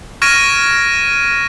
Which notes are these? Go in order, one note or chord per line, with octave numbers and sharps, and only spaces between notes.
C#6 F6 G#6 A#6 D7 D#7